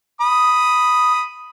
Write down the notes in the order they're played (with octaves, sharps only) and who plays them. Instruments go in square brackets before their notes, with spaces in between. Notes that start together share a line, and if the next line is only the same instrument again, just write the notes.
[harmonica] B5 D#6